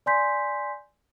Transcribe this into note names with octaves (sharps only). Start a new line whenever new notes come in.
D5 G#5 C6 G6 B6